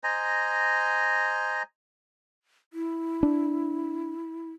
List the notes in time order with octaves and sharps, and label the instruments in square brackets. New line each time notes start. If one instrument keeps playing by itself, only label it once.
[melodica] C5 D#5 G#5 A#5
[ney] E4
[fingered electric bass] D4